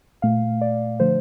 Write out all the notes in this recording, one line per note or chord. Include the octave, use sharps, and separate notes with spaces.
A#2 A3 F5
D5
D3 F3 A3 C5